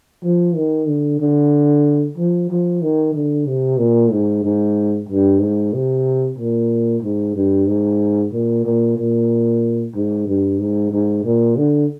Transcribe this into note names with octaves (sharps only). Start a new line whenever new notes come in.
F3
D#3
D3
D3
F3
F3
D#3
D3
C3
A#2
G#2
G#2
G2
G#2
C3
A#2
G#2
G2
G#2
A#2
A#2
A#2
G#2
G2
G#2
G#2
A#2
D3